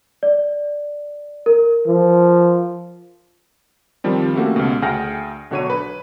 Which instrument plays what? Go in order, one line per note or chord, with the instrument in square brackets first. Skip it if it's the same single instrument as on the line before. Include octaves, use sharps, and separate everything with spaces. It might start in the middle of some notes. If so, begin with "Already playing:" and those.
[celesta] D5
A#4
[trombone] F3
[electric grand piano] D#3 F3 G3 C4
A3 A#3 C#4 F#4 G4 A4
C#2 B2
D2 G#4 F#5 G5 F6 A#6
B1 D3 F#4 C#5 C#6 D#7
B4